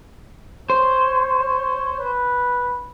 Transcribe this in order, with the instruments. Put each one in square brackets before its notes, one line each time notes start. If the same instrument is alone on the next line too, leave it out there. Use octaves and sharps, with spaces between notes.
[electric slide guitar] C5 [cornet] C#5
[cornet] B4